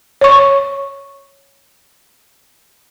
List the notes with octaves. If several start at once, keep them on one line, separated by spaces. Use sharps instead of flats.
C#5 C#6